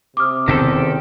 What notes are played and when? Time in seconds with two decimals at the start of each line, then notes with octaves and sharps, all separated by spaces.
0.17 C3 D6 D#6 F6
0.48 E1 E2 C3 D#3 C4 C#4 G4 A4